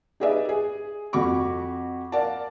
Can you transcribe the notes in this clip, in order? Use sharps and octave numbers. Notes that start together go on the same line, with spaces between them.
D#4 G4 G#4 B4 D5 E5
G#4
F2 F#4 B5 C#6 D6
A#4 D5 F5 F#5 A5